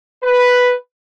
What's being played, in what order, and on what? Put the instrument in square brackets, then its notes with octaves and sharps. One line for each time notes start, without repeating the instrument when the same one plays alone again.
[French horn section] B4